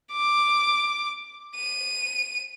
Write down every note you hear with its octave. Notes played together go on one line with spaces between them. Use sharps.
D6
D#7